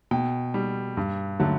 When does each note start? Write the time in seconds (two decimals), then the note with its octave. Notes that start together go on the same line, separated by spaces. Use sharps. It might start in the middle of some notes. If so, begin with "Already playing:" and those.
0.11 B2 G5
0.54 G3
0.97 G2
1.40 D3 F#3 A3